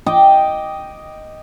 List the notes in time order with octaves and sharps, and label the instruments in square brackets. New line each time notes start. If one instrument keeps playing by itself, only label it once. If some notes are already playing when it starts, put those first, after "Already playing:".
[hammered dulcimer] D#5 G5 D6